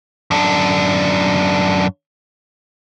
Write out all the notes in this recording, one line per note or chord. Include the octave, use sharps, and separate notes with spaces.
F#2 D4